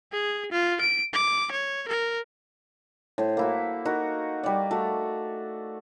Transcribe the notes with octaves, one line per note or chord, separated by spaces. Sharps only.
G#4
F4
D7
D6
C#5
A#4
A2 C5
A#3 E4 F#4
D#4 F#4 A#4
G3 D5
A3 F#4